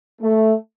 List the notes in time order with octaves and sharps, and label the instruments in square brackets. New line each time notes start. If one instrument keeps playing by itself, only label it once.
[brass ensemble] A3